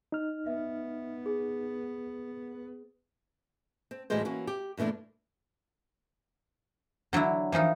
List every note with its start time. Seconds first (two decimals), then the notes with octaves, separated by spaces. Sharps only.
0.12 D#4 F6
0.47 B3 E5
1.26 G#4
3.91 C4
4.10 D2 A2 E3 G3 G#3 C5
4.25 E3 A#3 C#4 F#4
4.47 G4
4.77 G2 A#2 E3 A3 D4
7.13 D3 F#3 D4 E4
7.52 E3 F3 D#4 A#4